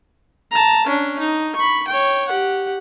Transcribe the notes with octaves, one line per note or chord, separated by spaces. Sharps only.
A5 A#5
C#4 D4
D#4
B5 C#6
C#5 G5
G4 F#5